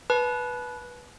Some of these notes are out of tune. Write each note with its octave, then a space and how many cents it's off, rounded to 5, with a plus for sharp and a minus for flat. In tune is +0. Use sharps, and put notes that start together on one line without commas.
B4 -10 A5 -35